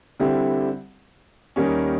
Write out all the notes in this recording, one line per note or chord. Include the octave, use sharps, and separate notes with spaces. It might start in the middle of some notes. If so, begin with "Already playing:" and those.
D3 G3 C4 E4 G4
D#2 D#3 G3 A#3 C#4